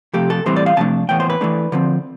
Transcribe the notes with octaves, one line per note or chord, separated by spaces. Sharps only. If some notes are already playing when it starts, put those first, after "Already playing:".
C3 F3 A3 G4
A4
A2 E3 G3 C4 C5
D5
F5
C3 F3 A3 D4 A5
A2 E3 B3 G5
C5
B4
E3 A3 D4
D3 F3 C4